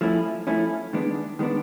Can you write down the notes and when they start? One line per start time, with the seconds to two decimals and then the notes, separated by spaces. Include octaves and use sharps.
0.01 F3 A3 C#4 E4
0.47 F3 A3 C#4 E4
0.93 D#3 G#3 B3 D4
1.39 D#3 G#3 B3 D4